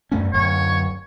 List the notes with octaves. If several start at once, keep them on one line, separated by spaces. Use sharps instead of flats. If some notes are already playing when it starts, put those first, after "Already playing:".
F#2 A3 C#4
D1 F#2 C#5